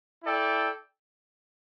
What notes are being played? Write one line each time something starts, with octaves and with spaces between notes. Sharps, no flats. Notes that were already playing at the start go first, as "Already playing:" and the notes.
E4 A4 D5 G5